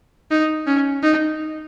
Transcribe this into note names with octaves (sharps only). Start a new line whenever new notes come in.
D#4
C#4
D#4